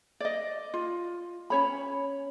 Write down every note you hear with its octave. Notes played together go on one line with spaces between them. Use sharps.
D5 D#5
F4
C#4 C#5 B5